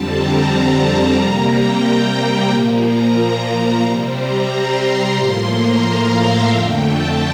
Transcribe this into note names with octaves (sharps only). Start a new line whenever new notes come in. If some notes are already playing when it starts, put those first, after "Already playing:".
Already playing: F2 D3 G3 C4 A5
A#5
A5
A5
C3 G3 A#3 A#5
G5
G5
A#2 F3 A#3
A#5
A#5
C3 G3 C4
A#5
C6
A#5
A2 F3 A#3 C6
A#5
F5
E5
F2 D3 A3 G5
A5